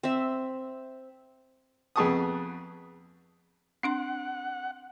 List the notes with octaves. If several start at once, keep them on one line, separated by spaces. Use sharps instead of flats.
C4 E5
F2 B3 G#4 A5 C#6 D#6
C4 D4 F#5 C6